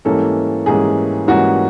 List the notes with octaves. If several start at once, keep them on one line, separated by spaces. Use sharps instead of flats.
G#2 E3 G3 A#3 C#4 A4
G#2 E3 G3 A#3 C#4 G#4
G#2 E3 G3 A#3 C#4 F#4